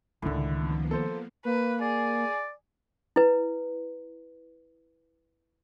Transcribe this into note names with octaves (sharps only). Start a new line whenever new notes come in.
C#2 A2 D3 D#3 C#4
F3 A#3 B3
A4 C5
A#3 B4
G#4 D5
E4 B4